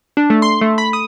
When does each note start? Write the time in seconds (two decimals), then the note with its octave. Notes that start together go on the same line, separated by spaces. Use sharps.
0.17 D4
0.30 A3
0.42 C6
0.61 A3
0.78 B5
0.93 D#6